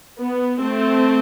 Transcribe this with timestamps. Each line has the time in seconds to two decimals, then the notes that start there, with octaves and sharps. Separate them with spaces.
0.19 B3
0.61 A3 C4